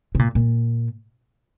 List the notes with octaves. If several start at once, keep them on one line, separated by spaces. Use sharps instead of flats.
C#3
A#2
A#2